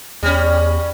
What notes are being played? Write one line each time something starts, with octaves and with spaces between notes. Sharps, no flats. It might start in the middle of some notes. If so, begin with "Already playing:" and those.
E2 G3 C#4